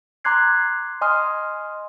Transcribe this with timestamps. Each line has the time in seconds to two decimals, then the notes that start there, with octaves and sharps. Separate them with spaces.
0.24 A#5 C6 D6 F#6 G#6 C7
1.01 D#5 G#5 C6 D#6 F6